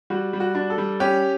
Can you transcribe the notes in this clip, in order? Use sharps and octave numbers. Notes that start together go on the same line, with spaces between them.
G3 F#4
G3
F#4
D4
A4
G3
C#4 G4